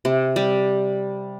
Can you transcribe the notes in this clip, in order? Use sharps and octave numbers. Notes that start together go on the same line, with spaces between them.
C3
G3